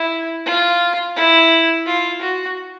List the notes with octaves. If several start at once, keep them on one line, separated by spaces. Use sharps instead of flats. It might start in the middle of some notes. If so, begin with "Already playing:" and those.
Already playing: E4
F4
E4
F4
F#4